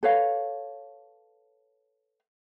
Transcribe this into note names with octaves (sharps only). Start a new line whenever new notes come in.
A4 B4 C#5 F5